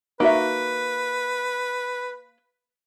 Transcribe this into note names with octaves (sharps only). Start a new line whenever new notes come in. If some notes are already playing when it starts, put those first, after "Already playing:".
A#3 D#4 F#4 B4 E5